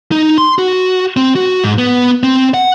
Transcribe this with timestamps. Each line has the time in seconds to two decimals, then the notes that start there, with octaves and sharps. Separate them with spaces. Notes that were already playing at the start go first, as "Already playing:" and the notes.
0.12 D#4
0.38 C6
0.58 F#4
1.17 C4
1.35 F#4
1.64 G#2
1.78 B3
2.23 C4
2.54 F#5